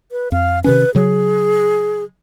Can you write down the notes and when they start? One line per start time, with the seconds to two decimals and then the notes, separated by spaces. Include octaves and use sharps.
0.12 B4
0.32 F2 F5
0.64 C3 D#3 C#4 B4
0.95 C#3 F#3 G#4